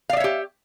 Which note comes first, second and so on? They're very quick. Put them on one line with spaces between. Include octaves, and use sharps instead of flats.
F5 D5 E5 C#5 G4